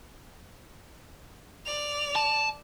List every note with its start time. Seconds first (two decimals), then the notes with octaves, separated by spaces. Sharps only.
1.66 D5 F7
2.15 A5